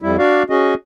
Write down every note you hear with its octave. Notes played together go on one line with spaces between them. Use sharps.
F2 G3 E4
D4 F#4 D5 F5
C#4 F#4 G#4 D#5